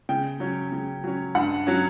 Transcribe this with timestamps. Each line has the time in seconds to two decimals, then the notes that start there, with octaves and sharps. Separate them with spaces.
0.09 C#3 G5
0.40 F#3 C#4
0.72 C#3
1.04 F#3 C#4
1.35 G2 F#5
1.67 F#3 C#4